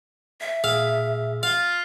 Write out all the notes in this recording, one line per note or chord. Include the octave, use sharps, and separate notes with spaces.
E5
A#2 G#4 F5 E6
F4 F5